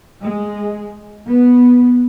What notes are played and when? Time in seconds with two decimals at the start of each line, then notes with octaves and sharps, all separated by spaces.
0.22 G#3
1.28 B3